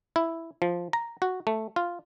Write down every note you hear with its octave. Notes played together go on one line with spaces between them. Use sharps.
E4
F3
A#5
F#4
A3
F4